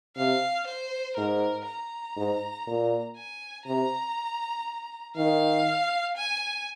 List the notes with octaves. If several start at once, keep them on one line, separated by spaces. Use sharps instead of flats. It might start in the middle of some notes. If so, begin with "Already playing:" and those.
C3 F5
C5
G#2 A#4
A#5
G#2
A#2
G#5
C3 A#5
D#3 F5
G#5